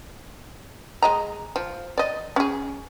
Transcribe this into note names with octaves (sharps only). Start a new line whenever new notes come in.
G#3 D#5 A#5
F3
D5 D#5
C#4 G#4